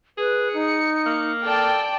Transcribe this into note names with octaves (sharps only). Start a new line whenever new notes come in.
G#4 B4
D#4 C#7
A#3
A4 D5 G5 A5